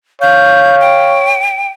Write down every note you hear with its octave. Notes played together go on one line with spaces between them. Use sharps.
C#5 F5 G6
G5